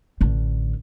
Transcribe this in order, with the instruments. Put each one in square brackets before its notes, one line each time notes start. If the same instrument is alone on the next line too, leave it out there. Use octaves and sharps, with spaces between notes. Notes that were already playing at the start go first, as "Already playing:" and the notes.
[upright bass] A1 D3